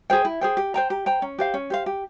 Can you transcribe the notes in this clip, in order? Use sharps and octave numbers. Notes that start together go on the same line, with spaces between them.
G#4 C5 G5
E4
G#4 C5 G5
G4
C5 G5 A#5
G4
C5 G5 A#5
C#4
G4 C5 F5
C#4
G4 C5 F5
G4